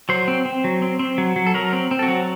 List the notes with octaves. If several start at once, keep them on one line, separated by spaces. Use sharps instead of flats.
F#3 C5
C4
C4
F#3
C4
C4
F#3
F#3
A4
F#3 A#4
C4
C4
A4
F#4
F#3